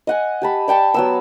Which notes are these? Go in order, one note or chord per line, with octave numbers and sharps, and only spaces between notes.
D#5 F#5 G#5
G4 A5 B5
D5 G5 A5 C#6
F#3 B3 E6